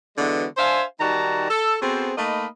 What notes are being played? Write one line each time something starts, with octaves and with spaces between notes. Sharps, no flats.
D3 E3 G#3 B3 F#4
D4 C5 E5 F5 G#5
D#3 G3 D#4 F#4 A5 A#5
A4
B3 C4 F#4 G#4 A4 C5
A3 A#3 D#4 D#5 B5